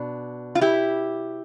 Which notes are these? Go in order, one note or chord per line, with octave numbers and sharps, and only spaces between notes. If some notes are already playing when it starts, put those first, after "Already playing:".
Already playing: B2 D4
F4
E4 G4